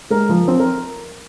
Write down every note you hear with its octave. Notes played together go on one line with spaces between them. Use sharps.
G#3 A#4
F3
C4
A#4